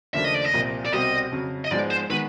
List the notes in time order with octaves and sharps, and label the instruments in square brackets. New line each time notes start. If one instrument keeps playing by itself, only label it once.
[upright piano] D#2 C#3 F3 A3 D4 [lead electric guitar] E5
[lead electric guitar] D#5
D5
D#5
[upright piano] C2 A#2 F3
[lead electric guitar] D5
[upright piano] C2 B2 G3 C4 [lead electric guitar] D#5
[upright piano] F2 C#3 F#3
[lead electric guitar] D#5
[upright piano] G#2 F3 G#3 B3 [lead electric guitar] D5
[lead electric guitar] C5
[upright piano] D#3 G#3 B3 [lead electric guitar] B4